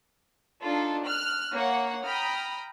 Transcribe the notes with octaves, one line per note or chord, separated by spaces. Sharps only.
D4 D#4 F4 A4
F6 F#6
A#3 C#5 F#5
G5 A#5 B5 D#6 F6